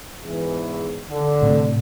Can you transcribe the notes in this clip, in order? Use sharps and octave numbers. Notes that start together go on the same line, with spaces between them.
E2 G#2 E3
D3
A2 C3